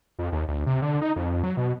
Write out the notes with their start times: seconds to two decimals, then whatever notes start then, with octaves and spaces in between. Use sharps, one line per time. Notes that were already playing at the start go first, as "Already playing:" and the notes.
0.19 F2
0.32 D#2
0.48 D2
0.66 C3
0.82 D3
1.02 D#4
1.16 F2
1.30 F2
1.43 F#3
1.57 B2